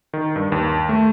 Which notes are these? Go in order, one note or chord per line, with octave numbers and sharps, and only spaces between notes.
D#3
G2
D#2
A3